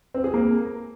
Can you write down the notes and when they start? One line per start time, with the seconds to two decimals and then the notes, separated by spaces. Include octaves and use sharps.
0.14 C4
0.24 G#4
0.34 A#3